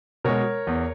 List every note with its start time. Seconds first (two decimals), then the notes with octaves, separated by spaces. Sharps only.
0.24 B2 G#3 A#4 C#5
0.67 E2